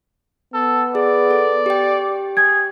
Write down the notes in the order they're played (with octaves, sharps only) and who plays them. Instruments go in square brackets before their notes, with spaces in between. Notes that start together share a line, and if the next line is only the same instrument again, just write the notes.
[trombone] B3 [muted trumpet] A4
[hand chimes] G#4 [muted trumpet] D5
[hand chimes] A4
G4 G5
[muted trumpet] G#4 [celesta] G#6